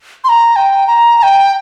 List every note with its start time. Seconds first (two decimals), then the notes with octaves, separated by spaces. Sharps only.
0.24 C6
0.29 A#5
0.56 G5
0.87 A#5
1.19 A#5
1.23 G5